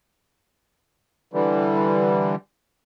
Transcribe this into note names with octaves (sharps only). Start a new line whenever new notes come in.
D3 E3 G3